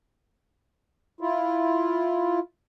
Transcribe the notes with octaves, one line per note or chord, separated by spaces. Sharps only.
E4 F4